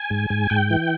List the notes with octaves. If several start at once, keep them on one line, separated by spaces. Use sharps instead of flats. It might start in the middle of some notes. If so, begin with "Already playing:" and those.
Already playing: G#5
G#2
G#2
G#2 G5
E3